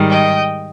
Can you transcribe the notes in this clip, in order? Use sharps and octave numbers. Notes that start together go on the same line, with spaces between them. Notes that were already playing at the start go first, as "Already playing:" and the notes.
Already playing: G#2 D#3 G3
D#5 G5